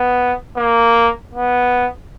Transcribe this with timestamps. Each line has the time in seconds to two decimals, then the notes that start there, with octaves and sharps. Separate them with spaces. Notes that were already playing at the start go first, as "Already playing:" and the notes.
Already playing: B3
0.57 A#3
1.34 B3